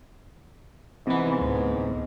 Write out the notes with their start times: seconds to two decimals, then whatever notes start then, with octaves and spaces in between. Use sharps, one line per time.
1.07 G#2 C3 E3 B3
1.41 D2 A2